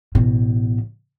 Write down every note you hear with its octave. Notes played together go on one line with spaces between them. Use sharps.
A1 B2